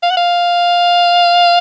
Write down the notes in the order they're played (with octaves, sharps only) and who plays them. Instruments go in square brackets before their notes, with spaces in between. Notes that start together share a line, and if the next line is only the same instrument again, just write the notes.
[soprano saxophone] F5
F#5
F5